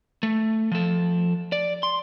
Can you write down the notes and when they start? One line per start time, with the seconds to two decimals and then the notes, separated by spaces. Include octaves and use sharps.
0.23 A3
0.72 F3 A4
1.52 D5
1.83 C6